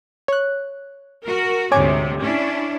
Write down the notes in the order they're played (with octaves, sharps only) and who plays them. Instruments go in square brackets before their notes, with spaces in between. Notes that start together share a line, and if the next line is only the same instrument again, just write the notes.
[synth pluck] C#5 F#6
[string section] F#4 A#4
[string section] D2 G#2 C3 [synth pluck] C#5 G#5 D6
[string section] C#4 D4 E4